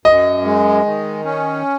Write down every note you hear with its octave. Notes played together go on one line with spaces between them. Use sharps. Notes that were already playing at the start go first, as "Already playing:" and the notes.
F#2 D#5
G#3
D#3
C#4